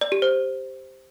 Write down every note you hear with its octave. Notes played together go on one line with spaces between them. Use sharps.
D5
G4
C5